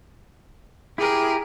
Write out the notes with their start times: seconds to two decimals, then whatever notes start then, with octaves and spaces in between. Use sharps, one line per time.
0.98 E4 G4 G#4 A#4